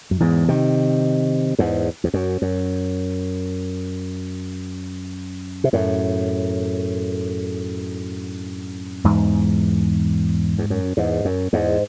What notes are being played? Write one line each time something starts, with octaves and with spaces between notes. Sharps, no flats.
F#2
E2 G#2
C3 D#3
E2 G#2
E2
F#2
F#2
C3
F#2 A2
E2 G#2
E2
F#2
E2 G#2
F#2
E2 G#2